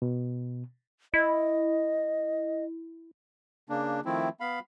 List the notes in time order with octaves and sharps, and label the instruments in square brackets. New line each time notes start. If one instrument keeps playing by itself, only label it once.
[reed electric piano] B2
[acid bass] E4 [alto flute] D#5
[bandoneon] C#3 A#3 D4
D#3 F3 A3 C4 E4
B3 F5 B5